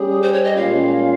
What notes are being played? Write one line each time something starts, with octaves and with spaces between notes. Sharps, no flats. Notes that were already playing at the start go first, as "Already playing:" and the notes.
Already playing: G3 C#4 G4 G#4
C5
C#5
D#5
A#2 G#3 C#4 F4 F5